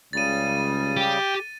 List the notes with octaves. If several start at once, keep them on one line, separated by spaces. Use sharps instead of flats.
C#2 C#3 G3 A6 D#7
G4